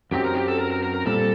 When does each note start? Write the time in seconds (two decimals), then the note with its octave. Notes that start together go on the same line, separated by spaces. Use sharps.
0.11 F#2 F#3 A3 C4 D#4 G4
0.24 A#4
0.35 G4
0.48 A4
0.59 A#4
0.70 A#4
0.83 A#4
0.93 A#4
1.06 A#2 G3 C4 A4